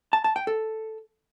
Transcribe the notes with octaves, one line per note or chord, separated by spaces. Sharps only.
A5
A5
G5
A4